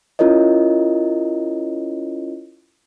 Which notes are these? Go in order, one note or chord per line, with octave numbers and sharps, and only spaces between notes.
C#4 E4 F4 A#4 C#5 D#5